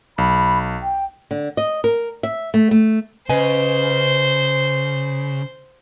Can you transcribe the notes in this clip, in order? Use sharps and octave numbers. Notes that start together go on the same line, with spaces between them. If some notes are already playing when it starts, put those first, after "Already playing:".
B1 B5
G5
D3
D#5
A#4
E5
A3
A3
C#3 B4 C5 D#5 G#5